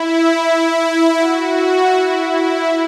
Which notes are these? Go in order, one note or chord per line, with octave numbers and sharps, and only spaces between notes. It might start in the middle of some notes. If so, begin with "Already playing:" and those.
Already playing: E4
F#4
E4
E4